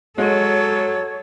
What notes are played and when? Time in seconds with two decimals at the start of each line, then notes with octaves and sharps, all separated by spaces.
0.18 F#3 G#3 A4 C#5